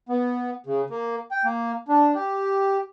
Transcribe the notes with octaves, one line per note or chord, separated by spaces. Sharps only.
B3
C#3
A#3
G5
A#3
D4
G4